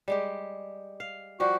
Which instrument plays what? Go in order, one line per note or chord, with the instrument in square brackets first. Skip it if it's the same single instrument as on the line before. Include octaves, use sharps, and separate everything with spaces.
[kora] G3 G#3 G4
F5
[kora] F3 G3 G4 [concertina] F#4